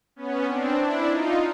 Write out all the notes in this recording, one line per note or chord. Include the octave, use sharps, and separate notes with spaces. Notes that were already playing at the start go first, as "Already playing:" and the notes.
B3 C#4
C4 D4
D4 E4
D#4 F4